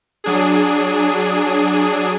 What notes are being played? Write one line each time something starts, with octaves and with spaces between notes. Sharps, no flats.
F#3 D4 G#4